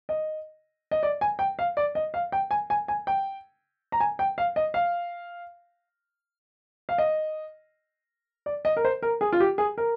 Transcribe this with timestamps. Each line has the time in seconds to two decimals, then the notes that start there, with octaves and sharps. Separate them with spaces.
0.09 D#5
0.91 D#5
1.03 D5
1.21 G#5
1.39 G5
1.59 F5
1.77 D5
1.95 D#5
2.14 F5
2.32 G5
2.51 G#5
2.70 G#5
2.88 G#5
3.07 G5
3.92 A#5
4.00 G#5
4.19 G5
4.38 F5
4.56 D#5
4.74 F5
6.89 F5
6.98 D#5
8.46 D5
8.65 D#5
8.77 A#4
8.84 C5
9.02 A#4
9.21 G#4
9.32 F4
9.40 G4
9.58 G#4
9.78 A#4